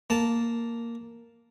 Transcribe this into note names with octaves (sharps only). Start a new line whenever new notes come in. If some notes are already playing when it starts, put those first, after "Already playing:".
A#3 A5